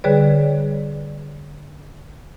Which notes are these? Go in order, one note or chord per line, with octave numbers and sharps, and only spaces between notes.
D3 G3 G#4 B4 C#5 D5